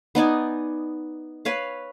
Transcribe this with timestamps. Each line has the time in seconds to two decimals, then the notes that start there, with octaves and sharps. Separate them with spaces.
0.15 B3 D#4 D5 G#5
1.45 B4 C#5 F5